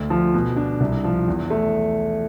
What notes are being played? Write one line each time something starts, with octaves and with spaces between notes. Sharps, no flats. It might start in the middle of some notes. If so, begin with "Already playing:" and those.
Already playing: D2
F3
B2
D4
C2
F3
E2
A3